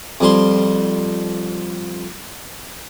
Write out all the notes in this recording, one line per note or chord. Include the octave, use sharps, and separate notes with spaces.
F2 G3 C6